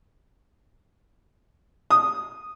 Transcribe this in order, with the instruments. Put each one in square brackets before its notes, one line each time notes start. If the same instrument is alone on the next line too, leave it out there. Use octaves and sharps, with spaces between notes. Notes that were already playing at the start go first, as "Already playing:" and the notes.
[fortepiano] D#6